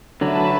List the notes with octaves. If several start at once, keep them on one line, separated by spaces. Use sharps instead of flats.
D3 F#3 F#4 B4 E5 A5